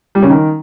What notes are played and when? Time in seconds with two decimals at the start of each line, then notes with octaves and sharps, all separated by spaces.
0.15 G3
0.22 C#3
0.30 D#3